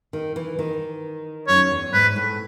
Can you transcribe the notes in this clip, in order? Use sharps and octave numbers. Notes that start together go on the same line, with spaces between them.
D#3
E3
D#3
F#2 C#5
E2
G#2 B4
A2